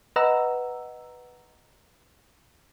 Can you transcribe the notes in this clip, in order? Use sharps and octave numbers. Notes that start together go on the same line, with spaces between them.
B4 D#5 F#5 A#5 E6